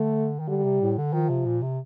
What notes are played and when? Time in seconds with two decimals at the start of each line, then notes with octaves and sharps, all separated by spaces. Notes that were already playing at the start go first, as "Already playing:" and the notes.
Already playing: D3 A3
0.40 D#3
0.48 D3 G3
0.64 C3
0.81 A2
0.98 D3
1.13 D#3 F3
1.29 C3
1.46 A#2
1.62 C3